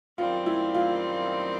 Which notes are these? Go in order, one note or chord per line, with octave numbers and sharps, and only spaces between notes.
F#2 D#3 G3 C4 F4
E4
F4